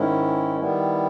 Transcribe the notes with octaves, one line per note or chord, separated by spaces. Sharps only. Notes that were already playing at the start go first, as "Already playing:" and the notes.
Already playing: G#2 D#3 G#3 C#4 E4
D#3 G3 B3 E4